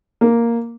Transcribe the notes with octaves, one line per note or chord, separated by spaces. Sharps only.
A#3